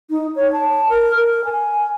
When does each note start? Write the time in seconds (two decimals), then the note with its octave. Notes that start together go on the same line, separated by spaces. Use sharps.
0.10 D#4
0.36 C#5
0.52 A5
0.90 A#4
1.16 A#4
1.45 G#5